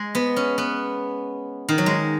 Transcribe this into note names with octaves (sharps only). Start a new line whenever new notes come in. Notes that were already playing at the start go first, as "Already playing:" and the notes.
Already playing: G#3
B3
C#4
B3
D#3
F#3
G#3